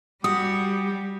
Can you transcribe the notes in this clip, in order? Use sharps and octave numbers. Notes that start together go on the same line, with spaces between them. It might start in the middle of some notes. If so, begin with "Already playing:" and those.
G3 F#4 G4 D#6